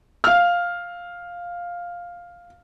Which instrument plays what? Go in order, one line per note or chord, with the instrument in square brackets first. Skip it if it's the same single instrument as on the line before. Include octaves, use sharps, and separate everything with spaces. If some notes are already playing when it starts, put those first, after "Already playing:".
[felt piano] F5 F6